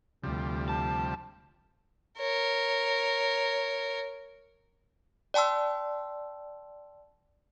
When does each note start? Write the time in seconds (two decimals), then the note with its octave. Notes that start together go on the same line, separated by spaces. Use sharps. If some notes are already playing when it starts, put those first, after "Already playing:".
0.23 D2 C3 F3 G3
0.69 A5
2.18 A#4 C#5
5.34 D5 G5 A5 C6 E6